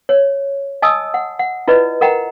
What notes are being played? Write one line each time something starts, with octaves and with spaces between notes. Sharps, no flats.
C#5
D#5 G#5 A5 D#6 E6
F#5
F#5
E4 F4 B4 D5 D#5
A#4 D#5 F#5 G5 A#5